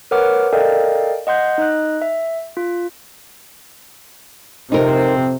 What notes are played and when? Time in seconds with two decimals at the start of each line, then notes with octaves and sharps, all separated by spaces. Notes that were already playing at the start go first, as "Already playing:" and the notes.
0.11 A#4 B4 C#5 F#5 D6 F6
0.53 A4 A#4 D5 D#5 F5 G5
1.27 D#5 F#5 C6 G6
1.58 D#4 D#5 F#6
2.02 E5
2.57 F4
4.72 F2 C3 C4 D#4 A#4